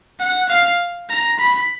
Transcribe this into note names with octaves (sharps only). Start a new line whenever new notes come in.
F#5
F5
A#5
B5